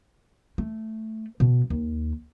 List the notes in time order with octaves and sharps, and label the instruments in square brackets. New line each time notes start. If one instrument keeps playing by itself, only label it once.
[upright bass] A3
B2
D#2